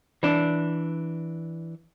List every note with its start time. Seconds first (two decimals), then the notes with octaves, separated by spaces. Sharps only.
0.23 E3 D4